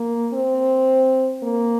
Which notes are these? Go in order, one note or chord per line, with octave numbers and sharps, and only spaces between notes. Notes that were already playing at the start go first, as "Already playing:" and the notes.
Already playing: A#3
C4
A#3